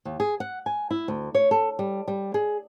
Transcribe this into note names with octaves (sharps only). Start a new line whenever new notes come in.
D#2
G#4
F#5
G#5
E4
D2
C#5
A4
G3
G3
G#4